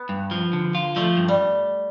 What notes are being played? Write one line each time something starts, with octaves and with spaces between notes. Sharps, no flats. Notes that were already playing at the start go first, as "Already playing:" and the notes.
Already playing: B3
G2
F3
D3
F4
F3 A3
G2
G3